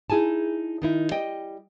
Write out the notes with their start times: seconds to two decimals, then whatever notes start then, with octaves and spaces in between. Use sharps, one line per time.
0.10 D#4 E4 G#4 G#5 A5
0.82 D#3 D#4 E4
1.11 G3 D#5 G5